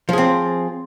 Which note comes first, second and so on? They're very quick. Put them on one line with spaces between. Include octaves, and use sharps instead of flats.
F3 G#4 C4